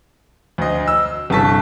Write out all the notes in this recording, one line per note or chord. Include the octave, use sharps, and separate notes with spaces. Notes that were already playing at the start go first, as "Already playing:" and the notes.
D2 D#5
E6
G1 C2 A4 A5 C#6 B6